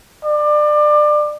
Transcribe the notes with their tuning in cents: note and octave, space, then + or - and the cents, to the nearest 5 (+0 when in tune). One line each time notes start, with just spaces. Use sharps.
D5 +25